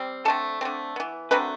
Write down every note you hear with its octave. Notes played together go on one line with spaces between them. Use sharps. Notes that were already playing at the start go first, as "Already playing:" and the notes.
Already playing: G3 C4
D3 A3 C4 A4 A5
D3 A3 C4
E3 B3
D3 F#3 A3 C4 B4 B5